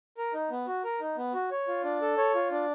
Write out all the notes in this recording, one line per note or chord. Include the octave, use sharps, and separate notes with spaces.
A#4
D#4
B3
F#4
A#4
D#4
B3
F#4
C#5
F4
D4
A4
C#5
F4
D4